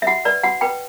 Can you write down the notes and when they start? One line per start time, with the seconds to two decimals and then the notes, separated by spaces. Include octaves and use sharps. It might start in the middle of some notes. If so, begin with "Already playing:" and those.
0.02 E5
0.07 F#4 F#5
0.25 B4 D5
0.43 F#4 F#5
0.61 B4 G5